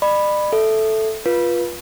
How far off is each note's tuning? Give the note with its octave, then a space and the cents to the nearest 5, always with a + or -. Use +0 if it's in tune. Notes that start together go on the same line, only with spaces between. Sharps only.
D5 +45 B5 +0
A4 -5 E5 +0
F4 +0 B4 -25